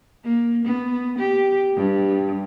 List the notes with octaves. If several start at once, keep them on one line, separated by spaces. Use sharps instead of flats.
A#3
B3
G4
G2